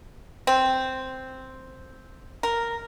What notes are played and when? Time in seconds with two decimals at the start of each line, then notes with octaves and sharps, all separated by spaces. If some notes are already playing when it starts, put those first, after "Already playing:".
0.47 C4
2.43 A#4